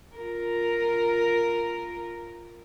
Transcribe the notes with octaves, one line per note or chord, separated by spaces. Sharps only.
F4 A#4